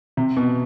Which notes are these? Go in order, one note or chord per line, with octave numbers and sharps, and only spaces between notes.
C3
B2